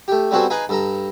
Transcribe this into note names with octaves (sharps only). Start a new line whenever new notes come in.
A3 G4
G3 B3 C4 F#4 G#4 A4
D#4 G#4 B4 F5 G#5 B5
G2 A4 A#5